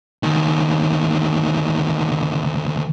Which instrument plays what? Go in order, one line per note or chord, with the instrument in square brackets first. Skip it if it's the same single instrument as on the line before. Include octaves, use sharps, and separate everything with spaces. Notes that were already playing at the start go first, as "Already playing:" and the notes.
[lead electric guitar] D2 D#3